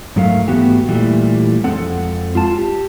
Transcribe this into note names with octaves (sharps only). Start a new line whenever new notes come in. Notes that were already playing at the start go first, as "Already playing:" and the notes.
G#2 F#3 A3 A#4 F5
G#2 E3 A3 B3 F#4 G4
A#2 E3 G3 A3
F2 G#3 C4 A4 F#5
F4 A5
G4